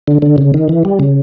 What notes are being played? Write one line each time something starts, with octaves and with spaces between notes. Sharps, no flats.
D3
D3
C#3
D#3
E3
G3
C#3